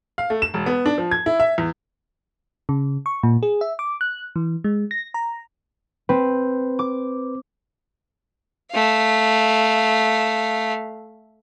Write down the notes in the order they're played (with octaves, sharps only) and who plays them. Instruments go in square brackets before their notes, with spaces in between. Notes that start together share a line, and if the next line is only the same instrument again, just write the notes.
[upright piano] F5
A3
E7
E1
B3
D4
F3
G#6
E4
E5
E2
[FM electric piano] C#3
C#6
A#2
G#4
E5
D6
F#6
E3
G#3
A#6
A#5
[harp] C4 [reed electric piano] B4
[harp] D6
[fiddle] A3 F5